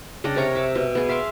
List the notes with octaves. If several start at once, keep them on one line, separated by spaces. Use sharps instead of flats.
C#3 D4 D#5 G5
C3 A#4 C#5 A#5
E5 D6
B2
B3 G#4
E5 F5 C6 D6